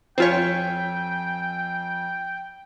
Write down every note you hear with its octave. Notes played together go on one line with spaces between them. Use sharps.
F2 C4 F4 C#5 G5 G#5 B6